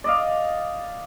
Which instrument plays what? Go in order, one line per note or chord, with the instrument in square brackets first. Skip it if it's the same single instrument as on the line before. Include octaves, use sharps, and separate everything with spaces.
[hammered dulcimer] D5 D#5 F5